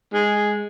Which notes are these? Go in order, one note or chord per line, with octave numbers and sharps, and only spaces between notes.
G#3